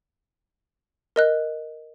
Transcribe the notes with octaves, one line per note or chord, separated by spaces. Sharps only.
A#4 D#5 F#6